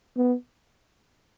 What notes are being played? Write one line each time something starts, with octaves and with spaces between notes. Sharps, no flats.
B3